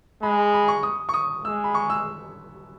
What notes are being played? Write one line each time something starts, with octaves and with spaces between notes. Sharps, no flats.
G#3 B5
B5
C#6
D#6
C#6
D#6
G#3 E6
B5
C#6
E6